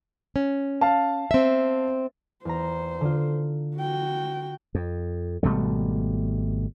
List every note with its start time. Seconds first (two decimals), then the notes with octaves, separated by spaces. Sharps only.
0.36 C#4
0.81 F5 A5
1.31 C4 E5
2.45 E2 C5 A#5
3.01 D3 F4
3.77 F#4 G5
4.75 F2
5.43 G#1 B2 G3 A3